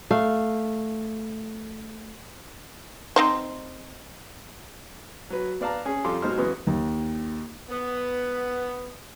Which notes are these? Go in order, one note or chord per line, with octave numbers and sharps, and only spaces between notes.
A3 F5
C4 D#4 C5
F#3 B4
B3 D5 F5 A5 A#5
C#4 G#4
F2 G3 F4 A4 C6 D6
B2 F#3 G#3 D#4 C5 F6
F#2 C#3 E3 G#3 B3
D#2
B3